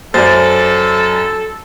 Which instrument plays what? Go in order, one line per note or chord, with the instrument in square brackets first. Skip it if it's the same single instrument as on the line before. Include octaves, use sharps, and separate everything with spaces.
[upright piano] F#2 [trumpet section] A4 [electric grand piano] C5 D5 [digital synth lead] A6